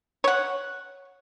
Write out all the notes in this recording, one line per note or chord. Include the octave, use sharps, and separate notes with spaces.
C#5 F#5